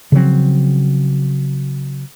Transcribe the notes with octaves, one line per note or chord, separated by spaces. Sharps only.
C#3 F3 F#3 C4